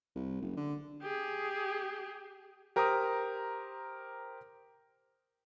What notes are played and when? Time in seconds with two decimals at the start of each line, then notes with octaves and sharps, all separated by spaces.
0.15 C2
0.42 F#1
0.57 D3
1.02 G4 G#4
2.76 G4 A#4 C5 A#5 D6 D#6